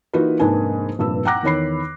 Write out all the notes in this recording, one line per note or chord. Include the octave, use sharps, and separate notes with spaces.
E3 A#3 D#4 F4 F#4 B4
F1 G#2 A#3 D4 B4 G#5
F1 G2 A#2 B4 E6
F#5 G5 A#5 D6 F#6 A#6
E2 D#3 C#5 B5 C7